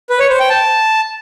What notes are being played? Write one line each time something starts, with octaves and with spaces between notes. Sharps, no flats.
B4
C#5
C5
G5
A5